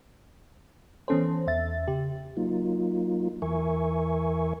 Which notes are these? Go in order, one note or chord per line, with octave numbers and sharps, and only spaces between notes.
E3 B3 C#4 A4 C5
E2 E5 A6
C#3 G4
F#3 A#3 D#4 F4
E2 E3 A#4 E5 G#5 C#6